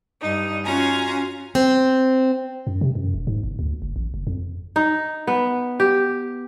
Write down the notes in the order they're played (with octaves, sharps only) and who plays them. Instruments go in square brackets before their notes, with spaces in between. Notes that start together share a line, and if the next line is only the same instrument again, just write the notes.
[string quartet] G2 D#4
C#4 F4 F#4 G#5 A#5
[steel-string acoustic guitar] C4
[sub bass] F#2
C3
F#2
E1
G#2
G1
D2
F#1
A1
F#1
F2
[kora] D#4
B3
G4